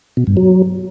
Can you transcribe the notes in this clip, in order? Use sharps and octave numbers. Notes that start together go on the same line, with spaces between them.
B2
G2
F#3